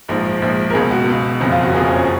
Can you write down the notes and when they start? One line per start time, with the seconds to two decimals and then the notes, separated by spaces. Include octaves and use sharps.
0.09 A#1 G#2 F3
0.42 A#1 G#2 F3
0.70 A#4
0.74 C#2 B2 G#4
0.91 F#4
1.08 C#2 B2
1.40 F#1 F2 C#3 F3
1.52 F4
1.63 F#4
1.74 F#1 F2 C#3 F3 G#4
1.85 C#5
1.95 C#5